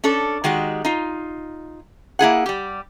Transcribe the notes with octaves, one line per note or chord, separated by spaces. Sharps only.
C#4 D4 A4
D#3 G#3 F#4 G4
D#4 F4
A#3 E4 G#4 F#5
G3 G4